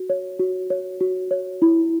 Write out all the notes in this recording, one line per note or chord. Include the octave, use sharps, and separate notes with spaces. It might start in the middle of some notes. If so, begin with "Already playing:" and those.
Already playing: F#4
C#5
F#4
C#5
F#4
C#5
E4